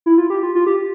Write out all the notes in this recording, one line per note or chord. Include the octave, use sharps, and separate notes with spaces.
E4
F4
G4
F4
F4
G4